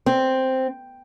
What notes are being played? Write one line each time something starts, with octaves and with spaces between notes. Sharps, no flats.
C4